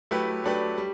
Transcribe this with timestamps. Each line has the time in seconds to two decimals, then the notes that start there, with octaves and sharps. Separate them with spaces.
0.11 F#3 A3 E4 G4 B4
0.44 F#3 A3 D4 G4 B4
0.78 G3